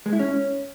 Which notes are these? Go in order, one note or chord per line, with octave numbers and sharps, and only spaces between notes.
G#3
E4
C#4